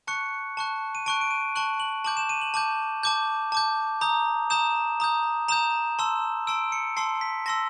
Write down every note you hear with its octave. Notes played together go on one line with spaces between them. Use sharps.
A5 C#6 F#6 C#7
A5 C#6 F#6
D#7
A5 C#6 F#6 D7
D7
D#7
A5 C#6 F#6 F#7
F#7
A5 D6 G6 F#7
E7
D#7
F#7
A5 D6 G6
A5 D6 G6
A5 D6 G6
A#5 D#6 G6
A#5 D#6 G6 E7
A#5 D#6 G6
A#5 D#6 G6 E7
A5 C6 E6
A5 C6 E6 D7
C#7
A5 C6 E6 C7
B6
A5 C6 E6 A#6